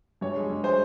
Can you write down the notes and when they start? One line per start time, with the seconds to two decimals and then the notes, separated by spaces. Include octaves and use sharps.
0.21 G2 C#5
0.36 G#3
0.50 G2
0.64 G#3 C5